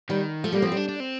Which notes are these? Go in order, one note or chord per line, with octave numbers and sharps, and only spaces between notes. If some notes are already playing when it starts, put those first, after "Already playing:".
D#3 G3
F3 A3
G3 A#3
F3 C4
G3
D4
D4
C4